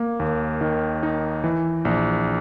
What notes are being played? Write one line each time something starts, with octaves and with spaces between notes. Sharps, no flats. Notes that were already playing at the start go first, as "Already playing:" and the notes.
Already playing: A#3
D#2
D#3
D#4
E3
A#1